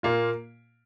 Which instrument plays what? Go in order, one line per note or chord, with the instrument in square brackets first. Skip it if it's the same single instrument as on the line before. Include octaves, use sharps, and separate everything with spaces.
[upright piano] A#2 A#3 F4